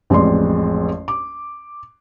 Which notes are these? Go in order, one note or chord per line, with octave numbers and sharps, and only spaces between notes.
A1 F2 G#3 D5 C6
D6